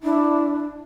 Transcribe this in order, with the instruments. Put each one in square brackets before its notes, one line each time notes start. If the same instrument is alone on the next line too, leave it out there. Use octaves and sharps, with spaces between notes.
[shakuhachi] D4 [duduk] E4